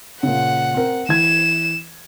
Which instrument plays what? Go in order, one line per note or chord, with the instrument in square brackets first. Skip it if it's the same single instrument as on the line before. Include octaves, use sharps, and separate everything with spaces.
[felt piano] A#2 C#3 [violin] F#5
[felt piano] C4 A#4
[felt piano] E3 G#6 [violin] E7